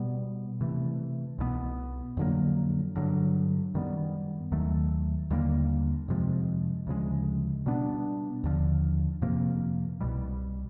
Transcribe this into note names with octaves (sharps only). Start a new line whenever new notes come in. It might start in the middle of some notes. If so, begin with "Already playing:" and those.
Already playing: B2 G3 B3
C3 E3 A3
C2 B2 G#3 B3
F2 D3 F#3 A#3
G2 D3 F#3
F#2 D#3 G3 B3
D#2 D#3 F#3 A3
D#2 D3 G3 A#3
F2 C3 F3 G#3
D2 C#3 F3 G#3
B2 G3 B3 D4
D#2 D3 F3
F2 C3 F3 A#3
C2 B2 G3